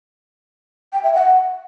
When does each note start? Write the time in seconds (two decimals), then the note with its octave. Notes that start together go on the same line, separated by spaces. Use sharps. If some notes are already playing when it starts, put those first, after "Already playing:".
0.93 G5
1.03 E5
1.14 F#5